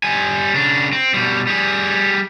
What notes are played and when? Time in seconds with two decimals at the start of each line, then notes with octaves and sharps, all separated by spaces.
0.03 G3 G#5
0.55 C#3 D4
0.92 C4
1.14 B2 G3
1.47 G3 G#4